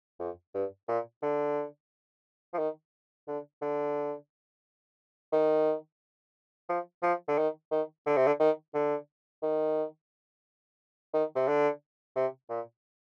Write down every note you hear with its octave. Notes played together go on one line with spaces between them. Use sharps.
F2
G2
A#2
D3
F3
D#3
D3
D3
D#3
F3
F3
D3
D#3
D#3
D3
C3
D3
D#3
D3
D#3
D#3
C3
D3
C3
A#2